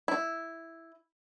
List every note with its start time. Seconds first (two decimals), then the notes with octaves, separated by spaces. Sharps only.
0.08 E4